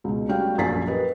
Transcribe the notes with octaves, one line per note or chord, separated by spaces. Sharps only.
C#2 B2
G3 A3 C#4 F#4 F5 G5
A#1 F#2 G#5 A6 B6 C7
G4 A#4 B4 D#5